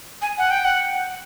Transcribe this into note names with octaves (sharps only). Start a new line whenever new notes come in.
G#5
F#5
G5
F#5